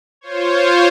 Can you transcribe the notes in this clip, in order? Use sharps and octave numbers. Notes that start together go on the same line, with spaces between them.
F4 C5 C#5